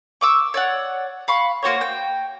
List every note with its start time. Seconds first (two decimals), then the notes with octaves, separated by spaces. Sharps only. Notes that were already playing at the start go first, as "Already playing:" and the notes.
0.21 C#6 D6 E6
0.54 C#5 D5 F#5
1.28 F5 B5 C#6
1.62 A#3 F#4 C5 C#5
1.81 G5